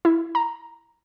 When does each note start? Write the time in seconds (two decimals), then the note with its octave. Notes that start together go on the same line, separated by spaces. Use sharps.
0.05 E4
0.35 A#5